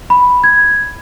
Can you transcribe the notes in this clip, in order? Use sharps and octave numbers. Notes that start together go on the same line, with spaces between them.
B5
G#6